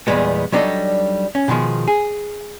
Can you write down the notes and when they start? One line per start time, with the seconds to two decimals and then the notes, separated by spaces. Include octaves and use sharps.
0.07 E2 A#2 G3 G#3 B3
0.52 F#3 G3 D4 D#4 A4 D#5
1.35 C#4
1.48 B2 D#3 F3 G#3
1.88 G#4